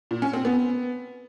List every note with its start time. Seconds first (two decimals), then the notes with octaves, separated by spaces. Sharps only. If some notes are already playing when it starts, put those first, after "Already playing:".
0.11 A#2
0.22 C#4
0.33 C4
0.45 B3